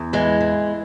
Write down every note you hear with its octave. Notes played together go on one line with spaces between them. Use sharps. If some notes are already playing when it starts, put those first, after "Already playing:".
Already playing: E2
E3 G#3
E3